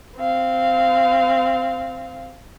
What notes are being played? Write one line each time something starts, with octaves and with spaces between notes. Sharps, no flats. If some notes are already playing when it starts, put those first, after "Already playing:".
C4 F5